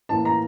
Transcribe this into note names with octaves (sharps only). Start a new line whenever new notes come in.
A2 E3 A#3 A5
A#5